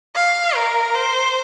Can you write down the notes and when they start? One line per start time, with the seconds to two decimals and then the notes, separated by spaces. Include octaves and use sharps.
0.15 F5
0.55 A#4
0.95 C5